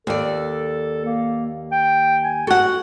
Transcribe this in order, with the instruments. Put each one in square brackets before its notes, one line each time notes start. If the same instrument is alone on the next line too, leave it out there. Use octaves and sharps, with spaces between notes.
[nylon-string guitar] D#2 D5 [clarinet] A4
[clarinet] A#3
G5
G#5
[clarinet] F#4 [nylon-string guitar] A4 F#5